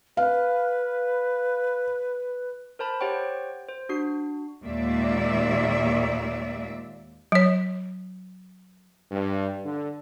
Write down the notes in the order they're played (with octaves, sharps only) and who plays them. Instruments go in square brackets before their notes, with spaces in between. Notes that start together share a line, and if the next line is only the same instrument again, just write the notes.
[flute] B4 [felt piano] F5
[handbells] A#4 C5 A5 B5
G4 C5 C#5 F#5 G5 C#6
C5
D4 F#4 C7
[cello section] D#2 A#2 G#3 A#3 D5 E5
[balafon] F#3 C#5
[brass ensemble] G2
D3